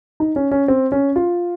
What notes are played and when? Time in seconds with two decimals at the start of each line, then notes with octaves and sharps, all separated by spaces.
0.20 D#4
0.36 C#4
0.51 C#4
0.68 C4
0.92 C#4
1.16 F4